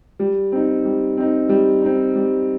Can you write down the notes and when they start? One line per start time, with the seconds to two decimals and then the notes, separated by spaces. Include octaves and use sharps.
0.19 G3
0.52 C4 D#4
0.85 G3
1.17 C4 D#4
1.49 G3
1.82 C4 D#4
2.15 G3